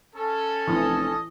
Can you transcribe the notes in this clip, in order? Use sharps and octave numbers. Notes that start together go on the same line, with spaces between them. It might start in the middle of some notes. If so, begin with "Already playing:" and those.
C#4 A4
F1 E3 D#5